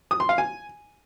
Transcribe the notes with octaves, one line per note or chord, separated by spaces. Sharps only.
D#6
C6
F5
G#5